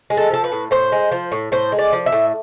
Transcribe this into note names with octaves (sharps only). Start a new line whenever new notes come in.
G#3
A4
F3 A4
B4
A2
A2 C5
G#3
F3
A2
A2 C5
G#3
D5
F3
E5
A2